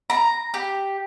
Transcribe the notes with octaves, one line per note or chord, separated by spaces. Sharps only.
A#5
G4